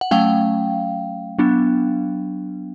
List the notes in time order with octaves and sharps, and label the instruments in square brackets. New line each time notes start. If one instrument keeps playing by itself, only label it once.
[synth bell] F#5
F#3 A3 C#4 F5 G5
F#3 B3 D4